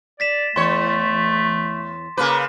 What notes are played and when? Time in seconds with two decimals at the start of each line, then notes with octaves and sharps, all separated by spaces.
0.20 D5 A6 B6 E7
0.56 E2 A3 C#5 C6
2.17 C#3 A#3 B4 D6